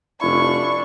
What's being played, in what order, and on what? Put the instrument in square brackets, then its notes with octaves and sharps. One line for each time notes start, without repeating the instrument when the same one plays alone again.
[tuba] F1 [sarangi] D4 [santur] E4 [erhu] C#6